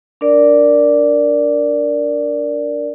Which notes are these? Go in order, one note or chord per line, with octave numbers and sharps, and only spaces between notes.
D4 A#4 D5